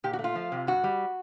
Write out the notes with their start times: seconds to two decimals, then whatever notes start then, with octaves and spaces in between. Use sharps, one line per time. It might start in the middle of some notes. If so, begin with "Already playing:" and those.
0.04 A#2 G4
0.13 F#4
0.19 A3
0.24 F4
0.35 F3
0.52 C3
0.67 G2 F#4
0.84 G3